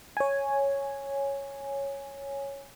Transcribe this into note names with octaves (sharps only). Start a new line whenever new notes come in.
C#5 G#5